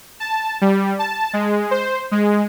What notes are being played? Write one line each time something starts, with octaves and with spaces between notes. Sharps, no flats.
A5
G3
A5
G#3
C5
G#3